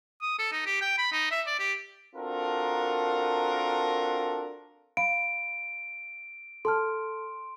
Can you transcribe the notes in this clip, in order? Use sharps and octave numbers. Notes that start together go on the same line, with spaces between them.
D#6
A4
D#4
G4
G5
B5
D#4
E5
D5
G4
C4 D4 F4 F#4 A4 A#4
F5 B5 D7
A4 A5 C6 F6